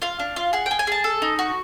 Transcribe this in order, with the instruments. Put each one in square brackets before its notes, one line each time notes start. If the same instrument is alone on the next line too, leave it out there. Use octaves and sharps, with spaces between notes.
[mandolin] F4 F5
D4
F4
G#4 F#5
G5
G#4
G#5
G#4 A5
A4
D#4
F#4